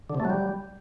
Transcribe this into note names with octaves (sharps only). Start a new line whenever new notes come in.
D3
C3
A3
F#3
G3